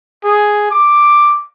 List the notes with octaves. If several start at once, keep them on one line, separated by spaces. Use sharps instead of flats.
G#4
D6